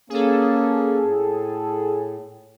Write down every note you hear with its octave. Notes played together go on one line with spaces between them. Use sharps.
A#3 C#4 G#4 A4
A2